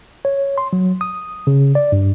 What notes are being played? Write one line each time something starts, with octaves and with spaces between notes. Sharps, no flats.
C#5
C6
F#3
D#6
C#3
D5
G2